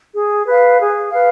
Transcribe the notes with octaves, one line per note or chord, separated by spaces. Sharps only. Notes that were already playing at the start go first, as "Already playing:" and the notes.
G#4
B4 F5
G#4
B4 F5